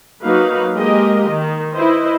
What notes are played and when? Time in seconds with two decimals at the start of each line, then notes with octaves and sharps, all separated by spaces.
0.24 F#3 A#3 D#4 F#4 B4 F5
0.74 G#3 A#3 G4 A#4 D#5
1.29 D#3
1.73 E4 B4 C5 D#5